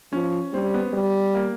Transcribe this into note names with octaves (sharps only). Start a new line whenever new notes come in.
F3 C#4
G3 C4
B3
G3
A#3